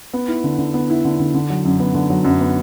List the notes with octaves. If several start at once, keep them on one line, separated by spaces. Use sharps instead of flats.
B3
E4
D3
D3
B3
E4
D3
D3
D3
F#3
F#2
B3
D3
F#3
F#2
B3